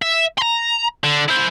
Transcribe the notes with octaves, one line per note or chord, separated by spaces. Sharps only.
E5
A#5 C6
D3
E4 C5